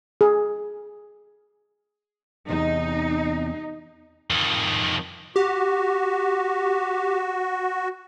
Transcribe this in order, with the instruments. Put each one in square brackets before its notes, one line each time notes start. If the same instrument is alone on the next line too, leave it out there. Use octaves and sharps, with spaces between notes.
[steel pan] G#4
[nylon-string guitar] E2 C3 [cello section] D#4
[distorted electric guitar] F2 D#3
[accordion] F#4 [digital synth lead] G4